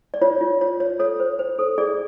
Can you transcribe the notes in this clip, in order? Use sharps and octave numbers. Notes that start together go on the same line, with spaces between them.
D5
F4 C#5
F4
C#5
C#5
A4 C#5
C5
C5
A4
G#4 D5